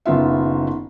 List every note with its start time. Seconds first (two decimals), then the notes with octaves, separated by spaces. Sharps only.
0.06 F#1 D#3 B3 F4 E5